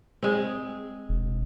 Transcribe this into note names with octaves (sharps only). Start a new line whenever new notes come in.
G#3 C4
E1